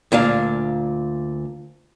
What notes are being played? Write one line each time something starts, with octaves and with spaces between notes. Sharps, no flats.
D2 A#2 D4 F5